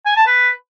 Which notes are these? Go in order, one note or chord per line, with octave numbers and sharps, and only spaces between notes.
G#5
A5
B4